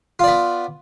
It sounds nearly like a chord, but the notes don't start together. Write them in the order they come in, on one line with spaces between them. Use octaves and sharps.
F4 D5 B3